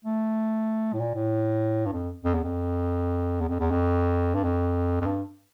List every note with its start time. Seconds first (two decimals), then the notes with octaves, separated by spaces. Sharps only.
0.05 A3
0.94 A2
1.00 A#2
1.15 A2
1.86 G2
1.93 F2
2.24 F2
2.35 E2
2.44 F2
3.41 E2
3.49 F2
3.60 E2
3.71 F2
4.35 G2
4.44 F2
5.01 F2
5.06 G2